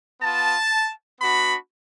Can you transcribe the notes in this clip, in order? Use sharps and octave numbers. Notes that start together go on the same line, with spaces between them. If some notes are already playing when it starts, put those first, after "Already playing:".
B3 F4 A5
B3 D4 F#4 B5